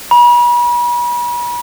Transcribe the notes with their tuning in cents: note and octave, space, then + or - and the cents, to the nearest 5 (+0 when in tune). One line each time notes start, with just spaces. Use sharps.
B5 -40